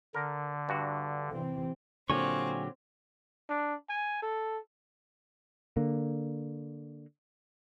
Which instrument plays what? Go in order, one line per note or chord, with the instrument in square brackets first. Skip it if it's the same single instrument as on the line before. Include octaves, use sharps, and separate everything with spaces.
[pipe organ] D3 [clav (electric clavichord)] A#4
[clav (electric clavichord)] G2 F#4
[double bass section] C3 E3 C4
[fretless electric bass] A#2 D3 [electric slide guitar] F#3 G4 [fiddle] C4 [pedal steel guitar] F5 G#5 C#6
[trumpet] D4
G#5
A4
[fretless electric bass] D3 A#3